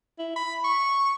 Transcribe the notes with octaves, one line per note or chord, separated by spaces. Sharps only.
E4
B5
C#6